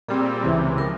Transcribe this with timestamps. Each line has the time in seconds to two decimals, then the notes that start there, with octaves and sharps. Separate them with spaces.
0.08 A#2 G3 C4 G#4
0.44 C#2 C3 E3
0.78 F3 A#4